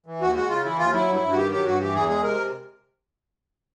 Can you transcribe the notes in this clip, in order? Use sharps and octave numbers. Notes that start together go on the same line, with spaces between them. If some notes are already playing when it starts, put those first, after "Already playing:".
E3
D#2 F#4
G#3 F#4
C#3 F4
E3 E4
D#2 F4
F#3 E4
G2
E4
G2
F#4
D#3 G4
F#3 G4
G2 F#4
E3 G4
E2 G#4
G#3 G#4
C3 A#4